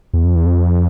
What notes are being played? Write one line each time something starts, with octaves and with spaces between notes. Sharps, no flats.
E2
F2
E2
F2